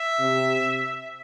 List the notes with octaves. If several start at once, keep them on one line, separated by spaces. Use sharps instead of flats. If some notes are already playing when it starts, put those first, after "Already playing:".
Already playing: E5
C3